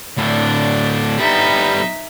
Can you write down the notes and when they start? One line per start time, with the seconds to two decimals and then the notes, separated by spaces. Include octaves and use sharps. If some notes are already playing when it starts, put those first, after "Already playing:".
0.17 A2 D3 D4
1.18 G3 B3 D#4 E5